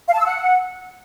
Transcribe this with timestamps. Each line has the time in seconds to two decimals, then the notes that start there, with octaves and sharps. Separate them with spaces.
0.08 F5
0.14 A5
0.20 E6
0.25 F#5